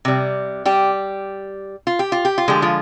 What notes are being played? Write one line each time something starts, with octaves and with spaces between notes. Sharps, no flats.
C3 G3
G3 G4
F4
G4
F4
G4
F4
D3 F3 G#3 G4
F3 F4